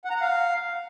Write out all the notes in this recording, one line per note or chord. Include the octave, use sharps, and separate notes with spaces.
F#5
A#5
F#5
F5